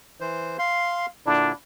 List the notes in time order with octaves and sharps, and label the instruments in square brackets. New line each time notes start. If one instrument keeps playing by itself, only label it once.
[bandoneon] E3 C5
F5 C6
[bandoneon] A#2 D3 E4 [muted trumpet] D4